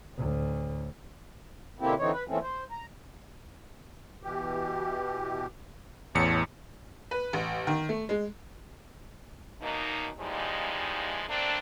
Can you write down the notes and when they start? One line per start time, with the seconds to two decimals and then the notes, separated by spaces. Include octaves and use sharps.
0.13 D2 A2
1.80 B2 D3 A#3 C4 E4 G4
1.99 D3 E3 C4 D#4 C#5
2.12 B4
2.28 A#2 E3 A3 C4 C#4
2.42 C5
2.71 A#5
4.23 B2 E3 G4
6.15 A1 E2 C#5 A5 C#7
7.11 B4
7.33 A1
7.67 D#3
7.89 A3
8.09 G#3
9.61 F#2 B2 A#3 D#4
10.19 E3 F3 G3 G#3 A#3 D#4
11.28 A3 A#3 C4 D4